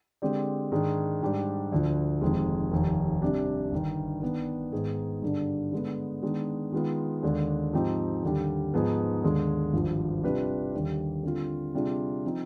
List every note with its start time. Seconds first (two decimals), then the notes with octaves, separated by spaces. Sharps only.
0.22 D3 G#3 C4 G4 D5
0.71 G#2 D#3 G#3 D4 G#4
1.22 G#2 G3 D4 G4
1.72 D2 D3 F3
2.21 F1 F2 D#3 G#3
2.71 F1 D#2 D#3
3.22 C3 G3 D4 G4
3.72 G1 G2 D#3
4.22 D#3 B3 D4
4.72 G#2 D#3 B3 D#4 G#4
5.22 G2 D3 G3 D4
5.72 D3 G#3 B3
6.22 D#3 G#3 B3 D4
6.72 D#3 G#3 B3 F4
7.22 D#2 D3 G#3 D4
7.73 G#2 F3 C4 D#4 G4
8.22 D#2 D3 G3
8.74 G#2 F3 B3 D#4 G#4
9.23 D#2 D3 G#3
9.73 G#1 G2 F3
10.23 C3 G3 D4 F4 B4
10.74 D#2 D3 G3
11.23 D3 G3 C4 F4
11.74 C3 G3 D4 F4 G#4
12.25 F3 C4 D#4